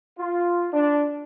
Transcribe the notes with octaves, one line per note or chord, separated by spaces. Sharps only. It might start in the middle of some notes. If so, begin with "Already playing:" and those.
F4
D4